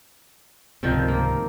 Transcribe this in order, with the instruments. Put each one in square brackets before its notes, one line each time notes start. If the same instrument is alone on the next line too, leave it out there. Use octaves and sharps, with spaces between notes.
[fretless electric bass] C#2 G#2 C3 [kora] D#3 F3 C4
[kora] A#3